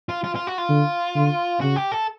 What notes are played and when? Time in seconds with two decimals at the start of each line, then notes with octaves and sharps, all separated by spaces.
0.09 F4
0.24 F4
0.35 F4
0.47 F#4
0.58 F4
0.69 D3
1.15 D3
1.61 C#3 F#4
1.76 G4
1.92 A4